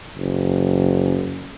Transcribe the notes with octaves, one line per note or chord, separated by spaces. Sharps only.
F#1